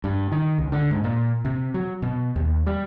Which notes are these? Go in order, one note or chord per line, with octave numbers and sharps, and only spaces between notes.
G2
D#3
C#2
D3
G#2
A#2
C3
F#3
B2
D#2
G3